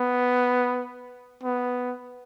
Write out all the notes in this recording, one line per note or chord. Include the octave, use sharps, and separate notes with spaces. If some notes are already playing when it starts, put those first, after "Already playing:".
Already playing: B3
B3